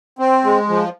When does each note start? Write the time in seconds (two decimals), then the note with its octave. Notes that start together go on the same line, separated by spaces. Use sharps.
0.19 C4
0.44 G#3
0.69 F3